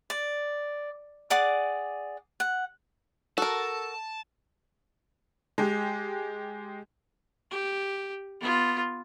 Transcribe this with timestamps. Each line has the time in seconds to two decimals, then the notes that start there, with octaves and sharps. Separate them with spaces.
0.10 D5
1.30 G#4 D5 F#5 D6
2.40 F#5
3.38 F#4 A4 A#4 A5
5.58 G#3 G4
7.51 G4
8.40 B3 F4